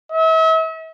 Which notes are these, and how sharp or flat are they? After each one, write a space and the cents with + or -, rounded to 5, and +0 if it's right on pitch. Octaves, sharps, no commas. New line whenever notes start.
E5 -40